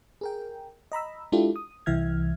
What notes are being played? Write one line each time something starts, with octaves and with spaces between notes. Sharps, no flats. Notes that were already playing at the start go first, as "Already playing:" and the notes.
G#4 A#4 G5
D#5 A#5 B5 E6
G#3 D4 E4 F4 G4 A4
D#6
C2 E3 E5 F6 G#6